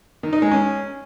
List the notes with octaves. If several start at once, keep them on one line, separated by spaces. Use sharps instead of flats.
D#3
D#4
G#3
C#4